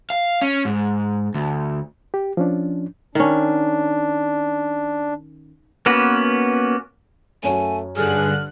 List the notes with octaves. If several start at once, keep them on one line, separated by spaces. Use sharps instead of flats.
F5
C#4
G#2
D2
G4
F3 C#4 D4
D#3 C#4 D4
A#3 B3 C#4 F#4 B4
F#2 A3 C#4 F#4 G#5
G2 D3 G#4 F6 F#6